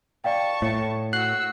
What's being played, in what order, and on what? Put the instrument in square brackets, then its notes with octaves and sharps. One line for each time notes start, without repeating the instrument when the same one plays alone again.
[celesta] D5 F5 G5 [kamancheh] A5 C#6
[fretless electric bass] A2 [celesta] C#5
[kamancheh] F#4 E6 [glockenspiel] F#6 C7 F#7